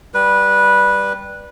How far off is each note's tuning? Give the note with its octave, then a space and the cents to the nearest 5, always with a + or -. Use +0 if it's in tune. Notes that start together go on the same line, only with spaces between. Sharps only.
G3 +0 B4 -15